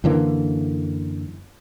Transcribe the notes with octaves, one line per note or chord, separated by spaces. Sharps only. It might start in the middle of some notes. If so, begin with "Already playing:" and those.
F#2 D3 E3 A#3